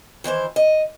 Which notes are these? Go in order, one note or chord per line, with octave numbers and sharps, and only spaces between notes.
D#3 E3 E4 C5
D#5